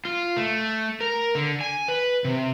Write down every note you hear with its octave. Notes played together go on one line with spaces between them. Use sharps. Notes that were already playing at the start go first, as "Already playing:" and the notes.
F4
A3
A#4
D3
G#5
B4
C3